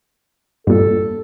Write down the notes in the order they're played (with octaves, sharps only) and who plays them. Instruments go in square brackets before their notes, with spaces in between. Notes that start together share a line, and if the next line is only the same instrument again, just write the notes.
[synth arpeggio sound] G2 A#2 [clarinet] A4